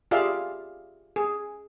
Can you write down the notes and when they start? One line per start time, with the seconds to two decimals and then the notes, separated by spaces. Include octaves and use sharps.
0.11 F4 G4 G#4 D5 E5 F5
1.16 G#4